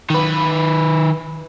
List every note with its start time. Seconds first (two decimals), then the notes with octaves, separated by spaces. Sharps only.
0.10 D#3 B4